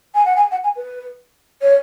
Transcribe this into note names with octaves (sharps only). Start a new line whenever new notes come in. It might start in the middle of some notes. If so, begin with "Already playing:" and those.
G#5
F#5
G#5
F#5
G#5
B4
C#5